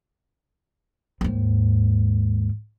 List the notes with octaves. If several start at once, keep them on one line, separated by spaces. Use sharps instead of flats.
D#2 G#2